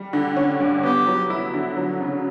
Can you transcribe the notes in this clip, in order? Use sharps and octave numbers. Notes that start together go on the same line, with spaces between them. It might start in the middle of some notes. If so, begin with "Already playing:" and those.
Already playing: G3
D3
C#4
G2
B3 G4
F#3
E4
D3
F#3
C#3